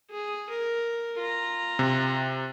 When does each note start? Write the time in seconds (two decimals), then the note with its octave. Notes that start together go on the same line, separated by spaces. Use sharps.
0.10 G#4
0.49 A#4
1.19 F4 A#5
1.79 C3